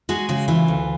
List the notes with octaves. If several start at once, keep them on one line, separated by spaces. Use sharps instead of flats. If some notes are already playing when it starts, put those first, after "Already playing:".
G#3 F#4 G#4
C#3 F#4
E3 F4
D2